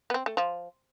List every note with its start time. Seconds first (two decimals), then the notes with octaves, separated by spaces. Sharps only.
0.10 B3
0.14 C4
0.26 A3
0.37 F3